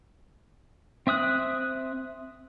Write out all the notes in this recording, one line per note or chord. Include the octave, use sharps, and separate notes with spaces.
C4 E5 D#6 F#6